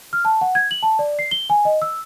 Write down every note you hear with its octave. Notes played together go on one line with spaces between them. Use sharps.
F6
A5
F#5
G#6
F#7
A5
D5
C7
G7
G#5
D#5
E6